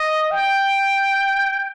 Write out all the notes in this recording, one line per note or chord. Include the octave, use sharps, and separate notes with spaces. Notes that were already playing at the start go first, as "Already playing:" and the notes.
Already playing: D#5
G5